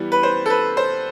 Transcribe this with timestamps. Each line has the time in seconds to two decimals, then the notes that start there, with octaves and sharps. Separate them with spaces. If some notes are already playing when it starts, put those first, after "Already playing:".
Already playing: E3 G3 B3
0.12 B4
0.23 C5
0.46 A4
0.50 B4
0.77 C5